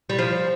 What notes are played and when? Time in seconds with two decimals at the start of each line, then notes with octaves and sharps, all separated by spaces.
0.10 G3
0.19 F3